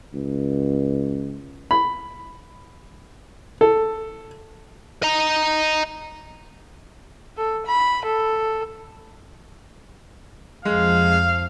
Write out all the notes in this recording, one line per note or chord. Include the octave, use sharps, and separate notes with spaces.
C#2
B5
A4
D#5 A#5
A4
B5
A4
F2 F3 G#3 F5